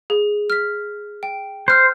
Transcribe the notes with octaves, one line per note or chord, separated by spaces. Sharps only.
G#4
F6 B6
G5
C5 F6 F#6